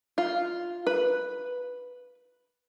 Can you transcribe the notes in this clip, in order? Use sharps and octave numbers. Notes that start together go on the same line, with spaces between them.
F4
B4